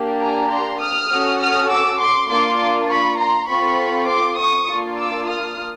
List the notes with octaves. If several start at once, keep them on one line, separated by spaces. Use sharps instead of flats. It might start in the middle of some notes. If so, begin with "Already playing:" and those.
Already playing: A#3 D4 G4
G#5 A#5
A#5 C6
D#6 F6
C#4 F#4 A4
D#6 F6
D6 E6
C6 D6
A#3 D4 F4 C6 D6
B5 C#6
A#5 C6
C4 F4 A4 B5 C#6
C6 D6
C#6 D#6
A#3 D4 F4
D6 E6
D#6 F6